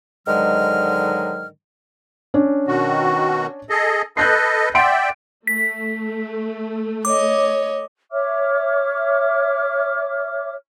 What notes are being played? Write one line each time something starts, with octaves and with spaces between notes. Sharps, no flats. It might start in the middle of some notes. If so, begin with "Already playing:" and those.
G#2 D3 D#3 F#3 G#3 F6
C#4 D4
B2 D#3 F#4
G#4 A4 D#5
A4 B4 D#5 F#6 G6 C7
D5 E5 F#5 G5 C6 D7
A3 B6
C#5 D#5 D6
C#5 E5 D6 F6